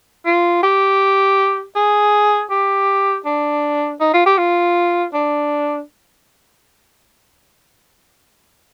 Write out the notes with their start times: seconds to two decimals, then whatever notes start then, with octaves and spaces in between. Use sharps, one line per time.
0.26 F4
0.63 G4
1.76 G#4
2.51 G4
3.26 D4
4.01 D#4
4.14 F4
4.26 G4
4.38 F4
5.14 D4